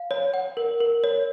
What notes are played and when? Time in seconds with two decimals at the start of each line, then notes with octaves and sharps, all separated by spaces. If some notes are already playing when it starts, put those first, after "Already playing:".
Already playing: F5
0.11 C#5
0.34 F#5
0.57 A#4
0.80 A#4
1.04 C#5